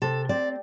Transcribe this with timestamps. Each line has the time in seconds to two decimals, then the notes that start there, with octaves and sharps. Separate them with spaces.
0.02 C3 A4
0.29 C4 D5